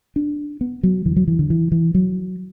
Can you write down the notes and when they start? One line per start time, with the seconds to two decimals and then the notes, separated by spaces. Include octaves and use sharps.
0.16 D4
0.61 B3
0.83 F#3
1.06 E2 D3 E3
1.16 F#3
1.28 E3
1.39 D3
1.50 E3
1.72 E3
1.94 F#3